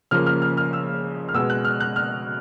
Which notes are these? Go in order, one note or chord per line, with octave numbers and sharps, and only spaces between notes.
C#3 F3 A#3 F6
F6
F6
F6
E6
F6
B2 G#3 B3 E6
F#6
F6
F#6
F6